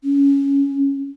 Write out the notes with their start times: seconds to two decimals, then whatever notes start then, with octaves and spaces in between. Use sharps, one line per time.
0.04 C#4